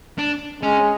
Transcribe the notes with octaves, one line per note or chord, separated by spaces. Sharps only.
D4
G#3 C#4